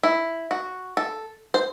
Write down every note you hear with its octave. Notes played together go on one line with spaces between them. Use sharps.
E4
F#4
A4
C5